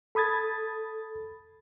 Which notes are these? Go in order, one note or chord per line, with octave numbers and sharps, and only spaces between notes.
A4 B5 D#6 G#6 A6